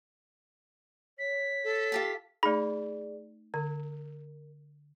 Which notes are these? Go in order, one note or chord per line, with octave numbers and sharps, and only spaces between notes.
C#5 B6
A4
F4 G4 A5
A3 D#4 G#4 D5 B5
D3 A#4